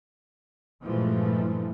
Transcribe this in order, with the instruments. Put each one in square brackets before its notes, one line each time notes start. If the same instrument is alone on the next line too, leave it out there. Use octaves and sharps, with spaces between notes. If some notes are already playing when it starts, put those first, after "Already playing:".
[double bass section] G2 A#2 E3 F3 G#3 A3